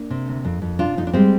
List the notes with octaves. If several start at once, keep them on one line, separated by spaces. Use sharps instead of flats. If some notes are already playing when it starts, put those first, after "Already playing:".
Already playing: A#3 D4
C3
D2
F2
F2
C3 D4 F4
F2 D#4
D4
G3 G#3 C4